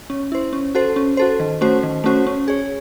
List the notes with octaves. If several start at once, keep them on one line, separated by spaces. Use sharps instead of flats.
C#4
E4 C5
C#4
F#4 A4 C5
C#4
F#4 A4 C5
D#3
A3 C#4 F#4 C5
D#3
A3 C#4 F#4 C5
C#4
G#4 C#5